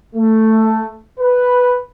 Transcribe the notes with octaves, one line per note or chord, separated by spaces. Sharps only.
A3
B4